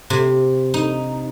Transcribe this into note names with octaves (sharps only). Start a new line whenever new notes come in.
C3
D#4